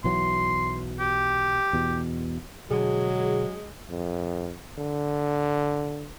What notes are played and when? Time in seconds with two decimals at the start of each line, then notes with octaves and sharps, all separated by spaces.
0.04 B1 E3 F#3 C6
1.00 G4
1.73 E2 B2
2.71 B2 D3 F#3 G#3 G#4
3.90 F2
4.78 D3